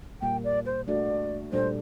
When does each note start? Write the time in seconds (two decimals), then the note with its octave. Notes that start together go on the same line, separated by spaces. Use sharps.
0.22 A#2 G3 A#3 G5
0.44 D5
0.66 C5
0.88 A3 D4 F#4 D5
1.53 A#2 G3 D4 A4 C5